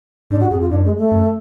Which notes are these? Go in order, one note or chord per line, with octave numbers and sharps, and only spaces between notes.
G#2 D4
F#4
F2 G#4
F4
F#2 D4
G#3
A3
F#2